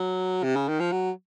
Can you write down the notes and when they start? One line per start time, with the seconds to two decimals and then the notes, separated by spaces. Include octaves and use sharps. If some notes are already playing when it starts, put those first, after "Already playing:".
Already playing: F#3
0.43 C3
0.56 C#3
0.68 D#3
0.80 F3
0.92 F#3